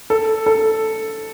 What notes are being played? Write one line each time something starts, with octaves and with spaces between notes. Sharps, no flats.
A4
A4